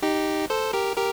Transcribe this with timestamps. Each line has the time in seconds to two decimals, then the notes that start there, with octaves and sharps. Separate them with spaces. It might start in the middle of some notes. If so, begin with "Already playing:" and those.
0.02 D#4 G4
0.50 A4 C5
0.73 G4 A#4
0.97 G4 A#4